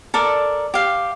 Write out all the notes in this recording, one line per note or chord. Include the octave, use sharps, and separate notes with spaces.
A4 A#4 D5
G4 F5